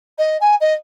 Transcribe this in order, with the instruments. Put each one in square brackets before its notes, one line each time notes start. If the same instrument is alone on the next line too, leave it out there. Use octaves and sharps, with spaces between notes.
[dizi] D#5
G#5
D#5